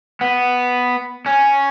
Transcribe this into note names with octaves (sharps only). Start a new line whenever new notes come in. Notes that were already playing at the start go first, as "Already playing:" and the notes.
B3
C#4